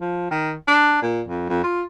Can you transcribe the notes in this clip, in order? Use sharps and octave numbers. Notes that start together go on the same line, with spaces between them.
F3
D#3
D4
A#2
F2
F2
F4